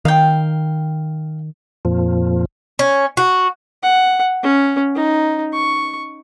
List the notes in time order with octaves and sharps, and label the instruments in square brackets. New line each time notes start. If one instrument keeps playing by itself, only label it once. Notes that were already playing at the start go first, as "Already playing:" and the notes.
[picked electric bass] D#3 [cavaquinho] F5 G5
[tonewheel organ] F2 A#2 F3
[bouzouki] C#4
F#4
[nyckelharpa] F#5
C#4
D#4
C#6